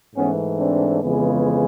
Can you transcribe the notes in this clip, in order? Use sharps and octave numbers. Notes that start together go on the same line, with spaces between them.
G#2 E3 A3 B3 C#4
C4 D4
F2 C#3 E3 G#3 B3